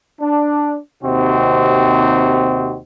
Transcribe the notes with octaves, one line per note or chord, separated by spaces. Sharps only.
D4
D#2 C3 C4 D#4 F#4